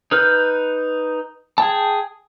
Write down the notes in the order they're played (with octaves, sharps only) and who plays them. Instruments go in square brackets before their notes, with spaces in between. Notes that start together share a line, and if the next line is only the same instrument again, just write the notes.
[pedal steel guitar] D#4 B4 F6 G6
G#4 G5 A5